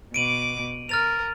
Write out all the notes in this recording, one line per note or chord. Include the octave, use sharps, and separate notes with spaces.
B2 D6 D7 D#7 F#7
A#4 F6 A6 F7